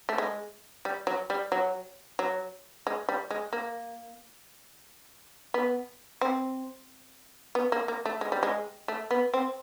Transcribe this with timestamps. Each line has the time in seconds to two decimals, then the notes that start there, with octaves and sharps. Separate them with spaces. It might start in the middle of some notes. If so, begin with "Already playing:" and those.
0.09 A3
0.18 G#3
0.85 G3
1.07 F#3
1.30 G3
1.52 F#3
2.19 F#3
2.87 G#3
3.09 G3
3.31 G#3
3.53 A#3
5.54 B3
6.21 C4
7.55 B3
7.72 A#3
7.88 A#3
8.06 A3
8.21 G#3
8.32 G3
8.43 G#3
8.88 A3
9.11 B3
9.34 C4